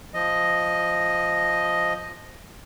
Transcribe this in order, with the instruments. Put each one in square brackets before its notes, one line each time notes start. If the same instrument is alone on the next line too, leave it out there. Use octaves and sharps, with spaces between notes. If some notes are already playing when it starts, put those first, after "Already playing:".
[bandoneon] F3 D#5